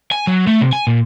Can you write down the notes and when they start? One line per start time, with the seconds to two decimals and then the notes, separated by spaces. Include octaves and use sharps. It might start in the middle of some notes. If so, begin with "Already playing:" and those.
0.12 G#5
0.27 F#3
0.47 A3
0.61 C3
0.73 G#5
0.87 A#2